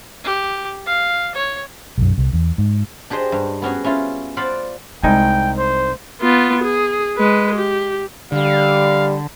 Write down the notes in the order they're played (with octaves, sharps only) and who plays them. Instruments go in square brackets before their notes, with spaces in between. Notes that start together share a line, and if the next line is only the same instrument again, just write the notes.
[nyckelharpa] G4
F5
C#5
[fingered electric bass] B1 F#2
C2
E2
G#2
[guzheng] D4 G4 G#4 C5 D#5
G2
B3 C#4 F#4 G#4
C#4 E4 F4
F4 C5 D5 F5 F#5 B5
[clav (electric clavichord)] C2 D#4 G#5 [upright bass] G#3 [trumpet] G5
[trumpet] C5
[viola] B3 F4
G#4
G#3 B4
G4
[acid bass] D3 [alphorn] G3 [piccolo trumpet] F5